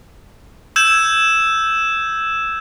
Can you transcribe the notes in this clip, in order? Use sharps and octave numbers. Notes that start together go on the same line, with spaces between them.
E6 G6 G#6 E7